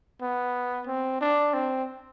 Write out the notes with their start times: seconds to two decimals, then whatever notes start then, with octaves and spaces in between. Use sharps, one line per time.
0.22 B3
0.87 C4
1.21 D4
1.54 C4